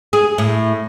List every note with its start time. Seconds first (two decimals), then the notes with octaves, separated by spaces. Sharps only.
0.13 G#4
0.38 A2